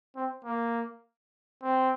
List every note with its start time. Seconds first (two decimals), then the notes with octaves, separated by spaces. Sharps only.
0.16 C4
0.45 A#3
1.63 C4